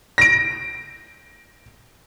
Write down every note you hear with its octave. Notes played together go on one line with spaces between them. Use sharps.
A#6 D7